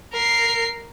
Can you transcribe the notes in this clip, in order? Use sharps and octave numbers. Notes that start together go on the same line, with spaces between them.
A#4 C7